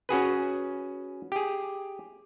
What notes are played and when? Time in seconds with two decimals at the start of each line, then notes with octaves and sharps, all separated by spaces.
0.09 C#4 F#4 G#4 B4
1.32 G4 G#4